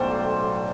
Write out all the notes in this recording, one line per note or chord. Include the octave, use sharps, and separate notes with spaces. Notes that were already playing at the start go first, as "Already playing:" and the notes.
Already playing: B1 A2 F#3 C5 D5 F#5 G5